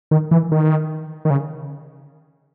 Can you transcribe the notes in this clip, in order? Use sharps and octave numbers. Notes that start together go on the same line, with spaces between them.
D#3
E3
D#3
D#3
C#3